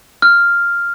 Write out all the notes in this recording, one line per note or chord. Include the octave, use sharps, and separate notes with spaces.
F6